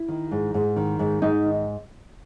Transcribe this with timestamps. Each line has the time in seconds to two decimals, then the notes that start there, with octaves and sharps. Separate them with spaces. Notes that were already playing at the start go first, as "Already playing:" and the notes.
Already playing: E4
0.08 D#3
0.31 G#2
0.54 G#2
0.76 D#3
0.99 G#2
1.22 G#2 D#4
1.45 D#3